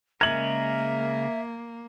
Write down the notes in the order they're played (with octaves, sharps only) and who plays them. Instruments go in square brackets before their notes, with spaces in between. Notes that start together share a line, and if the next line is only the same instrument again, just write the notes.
[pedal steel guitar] C#3 G#3 A#4 [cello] A#3 [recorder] E5 [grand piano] G#6 F#7